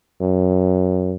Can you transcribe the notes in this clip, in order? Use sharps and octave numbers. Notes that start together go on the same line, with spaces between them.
F#2